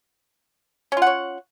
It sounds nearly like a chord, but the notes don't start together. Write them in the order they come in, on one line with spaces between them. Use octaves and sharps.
C#4 F4 F#5 C#5